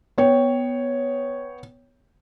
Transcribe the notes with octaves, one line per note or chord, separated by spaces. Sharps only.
B3 C#5 G5